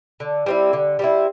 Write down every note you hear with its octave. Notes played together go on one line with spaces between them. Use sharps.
D3
G3 C4 E4
D3
G3 C4 E4